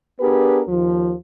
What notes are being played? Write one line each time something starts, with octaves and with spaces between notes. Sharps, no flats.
B3 D4 G4 G#4 A#4 B4
D#2 F3